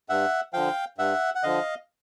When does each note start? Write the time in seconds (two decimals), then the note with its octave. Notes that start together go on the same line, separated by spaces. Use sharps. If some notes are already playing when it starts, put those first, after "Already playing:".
0.09 G2 E5 F#5
0.53 D3 F3 F5 G5
0.98 G2 E5 F#5
1.35 F#5
1.43 D3 F3 D#5 F5